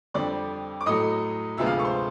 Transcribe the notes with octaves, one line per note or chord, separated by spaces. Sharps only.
F2 D3 G3 C4 D5 D6
D6
A2 F#3 A3 D#5 D#6
D2 C3 F3 G#3 B3 E5 E6
F5 F6
C#6
C5 C6